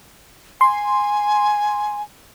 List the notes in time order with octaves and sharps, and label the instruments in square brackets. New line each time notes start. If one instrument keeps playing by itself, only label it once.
[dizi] G#5 [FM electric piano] C6